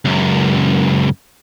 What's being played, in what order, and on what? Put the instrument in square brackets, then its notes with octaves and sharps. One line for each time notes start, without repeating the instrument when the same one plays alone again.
[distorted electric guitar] C#2 F#2